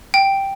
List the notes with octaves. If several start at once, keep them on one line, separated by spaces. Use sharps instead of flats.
G5